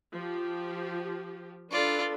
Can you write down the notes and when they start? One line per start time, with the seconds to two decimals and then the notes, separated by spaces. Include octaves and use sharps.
0.13 F3 G4
1.71 D4 F4 A4 B4 D5